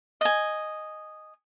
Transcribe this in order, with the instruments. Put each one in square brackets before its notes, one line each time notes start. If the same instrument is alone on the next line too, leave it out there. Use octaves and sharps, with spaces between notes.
[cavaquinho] D#5 G#5